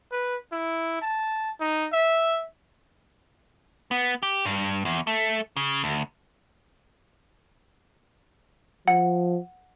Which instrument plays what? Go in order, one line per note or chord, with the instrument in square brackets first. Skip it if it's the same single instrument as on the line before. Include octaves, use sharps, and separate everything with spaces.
[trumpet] B4
E4
A5
D#4
E5
[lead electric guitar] B3
G4
G2
E2
A3
C#3
D2
[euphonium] F3 [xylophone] F#5